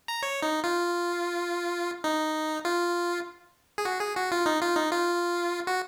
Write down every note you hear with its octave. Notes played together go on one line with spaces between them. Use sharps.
A#5
C#5
D#4
F4
D#4
F4
G#4
F#4
G#4
F#4
F4
D#4
F4
D#4
F4
F#4